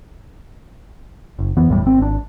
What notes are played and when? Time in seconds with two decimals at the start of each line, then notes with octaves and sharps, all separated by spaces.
1.39 F#1
1.57 F2 E3 B3
1.69 E1 E2 A2 G3
1.83 G#1 C4
1.98 G#1 D4